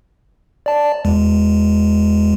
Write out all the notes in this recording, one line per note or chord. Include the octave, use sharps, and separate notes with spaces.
D5 A5
E2 G#3